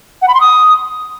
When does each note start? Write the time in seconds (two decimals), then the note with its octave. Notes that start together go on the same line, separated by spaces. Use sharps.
0.22 F#5
0.28 B5
0.34 C6
0.41 D#6